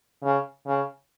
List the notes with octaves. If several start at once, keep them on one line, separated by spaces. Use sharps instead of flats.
C#3
C#3